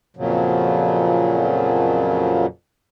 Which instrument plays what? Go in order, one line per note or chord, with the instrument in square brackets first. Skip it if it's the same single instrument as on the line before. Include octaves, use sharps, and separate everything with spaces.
[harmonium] F2 A#2 C#3 F3 F#3